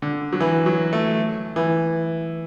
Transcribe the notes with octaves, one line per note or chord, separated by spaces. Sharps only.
D3
F#3
E3
F#3
A3
E3